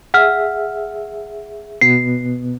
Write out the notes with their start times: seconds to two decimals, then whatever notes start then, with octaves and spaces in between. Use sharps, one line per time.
0.14 G#4 E5 F#5 F6
1.81 B2 B3 C7